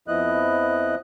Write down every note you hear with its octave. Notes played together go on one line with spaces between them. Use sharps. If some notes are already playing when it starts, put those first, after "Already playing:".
F2 F3 B3 E4 D#5 F#6